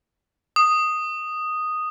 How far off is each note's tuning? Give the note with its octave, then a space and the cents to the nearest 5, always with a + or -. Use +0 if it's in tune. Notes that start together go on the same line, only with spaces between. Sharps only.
D#6 -5